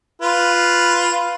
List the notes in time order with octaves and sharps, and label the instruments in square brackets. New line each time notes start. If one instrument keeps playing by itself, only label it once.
[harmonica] F4 B4